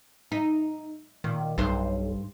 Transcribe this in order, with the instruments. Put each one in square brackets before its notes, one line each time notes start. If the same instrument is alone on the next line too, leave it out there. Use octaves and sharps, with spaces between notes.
[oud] D#4
[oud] A#2 [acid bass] D#3
[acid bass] B1 [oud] G2 C5